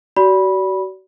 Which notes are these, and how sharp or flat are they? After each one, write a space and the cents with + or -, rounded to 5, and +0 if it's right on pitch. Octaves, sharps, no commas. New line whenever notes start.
F#4 +35 D5 -30 B5 -15